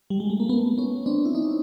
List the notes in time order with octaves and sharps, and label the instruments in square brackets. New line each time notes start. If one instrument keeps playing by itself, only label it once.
[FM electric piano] G3
G#3
A3
A#3
A3 B3
B3 C#4
C4 D4
E4
C#4 D#4